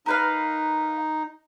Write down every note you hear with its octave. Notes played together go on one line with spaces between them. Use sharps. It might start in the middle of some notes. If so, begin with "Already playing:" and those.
D#4 A#4 B4 F5